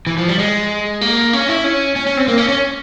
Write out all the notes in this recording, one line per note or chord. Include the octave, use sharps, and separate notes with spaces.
E3
F3
G3
G#3
A#3
C#4
E4
C#4
C#4
C#4
C4
A#3
C#4
C#4